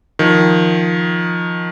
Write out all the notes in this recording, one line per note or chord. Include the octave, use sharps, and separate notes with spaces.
D#3 F3